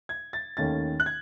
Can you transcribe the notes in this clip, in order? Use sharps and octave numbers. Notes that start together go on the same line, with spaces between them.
G#6
A6
D#2 D#3 A3 C#4 A6
F#6
G#6